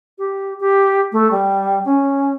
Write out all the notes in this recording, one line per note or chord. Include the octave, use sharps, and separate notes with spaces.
G4
G4
A3
G3
C#4